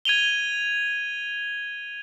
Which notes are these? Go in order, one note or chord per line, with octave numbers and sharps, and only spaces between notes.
G#6 D#7 F7 G7